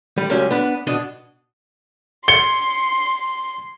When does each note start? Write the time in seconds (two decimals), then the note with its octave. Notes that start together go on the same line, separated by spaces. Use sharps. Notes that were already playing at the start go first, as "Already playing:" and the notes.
0.18 G3
0.30 C#2 F#3 G3 C#4
0.51 B3 D4 B4
0.87 B2 B3 D4 D#5
2.28 C6 C#7 G7